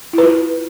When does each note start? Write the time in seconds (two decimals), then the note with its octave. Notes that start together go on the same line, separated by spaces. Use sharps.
0.13 E4
0.18 B4
0.23 F4